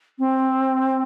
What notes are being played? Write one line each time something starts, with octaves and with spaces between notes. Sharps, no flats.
C4